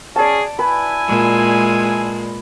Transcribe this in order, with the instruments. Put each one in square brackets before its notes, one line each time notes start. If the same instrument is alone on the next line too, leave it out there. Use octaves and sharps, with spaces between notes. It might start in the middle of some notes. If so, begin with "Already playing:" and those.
[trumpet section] C#4 G#4 [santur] D5 A5
[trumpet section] E4 G#5 [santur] B4
[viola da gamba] A#2 G#3